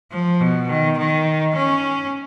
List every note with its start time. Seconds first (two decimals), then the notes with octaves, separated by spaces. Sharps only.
0.12 F3
0.41 B2
0.69 D#3
0.98 D#3
1.55 C#4